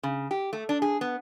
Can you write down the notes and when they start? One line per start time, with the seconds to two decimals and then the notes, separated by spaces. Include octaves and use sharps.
0.03 C#3
0.31 G4
0.53 A3
0.69 D4
0.82 G#4
1.01 B3